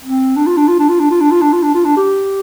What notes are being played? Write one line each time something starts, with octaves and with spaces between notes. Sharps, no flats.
C4
D4
F4
D4
F4
D4
F4
D4
F4
D4
F4
D4
F4
D4
F4
D4
G4